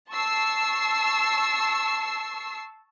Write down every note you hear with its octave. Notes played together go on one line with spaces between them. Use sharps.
A5 C#6 E6 C7